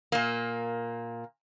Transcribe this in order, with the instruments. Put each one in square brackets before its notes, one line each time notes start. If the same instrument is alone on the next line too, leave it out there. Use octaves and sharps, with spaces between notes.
[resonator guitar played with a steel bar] A#2 A#3